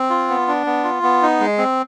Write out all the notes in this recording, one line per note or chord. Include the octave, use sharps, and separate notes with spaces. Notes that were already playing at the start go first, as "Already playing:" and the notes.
Already playing: C4
F4
B3
D4
B3
F4
B3
D#4
G#3
C4